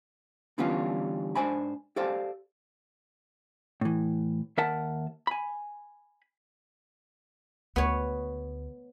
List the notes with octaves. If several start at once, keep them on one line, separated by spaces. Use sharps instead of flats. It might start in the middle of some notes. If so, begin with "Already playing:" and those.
D3 E3 G3 B3 C#4 F4
G#2 D4 C5 G#5 B5
G4 A4 C5 D5 F5
A2 E3
D#2 A#4 E5 F#5 A5
G#5 B5
D2 B3 C#5